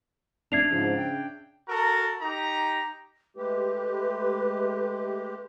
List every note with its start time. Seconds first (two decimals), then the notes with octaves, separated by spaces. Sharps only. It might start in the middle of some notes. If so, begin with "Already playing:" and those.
0.52 F1 D4 D5 E5 G#6 C7 F7
0.71 G#2 C#3 F3
0.97 G5
1.69 F#4 A4 A#4 A#5
2.22 D#4 G4 A#5
3.37 G#3 A3 G4 B4